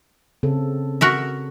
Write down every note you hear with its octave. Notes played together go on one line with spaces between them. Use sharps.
C#3 C4 A4
F#4 A#4 E5